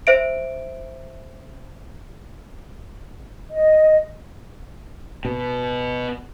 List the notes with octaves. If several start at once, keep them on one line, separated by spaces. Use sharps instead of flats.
C5 E5 D7
D#5
B2